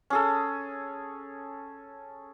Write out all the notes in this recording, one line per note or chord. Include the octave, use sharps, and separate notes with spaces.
C#4 G#4 A4